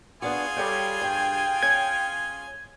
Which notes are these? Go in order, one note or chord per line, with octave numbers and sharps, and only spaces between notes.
B3 D4 F4 F#4 G#4 G#5
G3 A4 C#5 G5
G2 G5
C#4 G#6